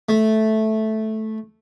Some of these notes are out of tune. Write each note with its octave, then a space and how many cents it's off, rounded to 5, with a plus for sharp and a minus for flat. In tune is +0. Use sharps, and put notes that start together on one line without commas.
A3 -10